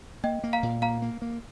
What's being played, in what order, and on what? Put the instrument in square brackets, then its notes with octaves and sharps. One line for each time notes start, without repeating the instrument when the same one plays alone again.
[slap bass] A#3 [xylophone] D#5 G5
[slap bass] A#3
[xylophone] F5 A#5
[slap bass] A#2
[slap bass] A#3 [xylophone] F5 A#5
[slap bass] A#3
A#3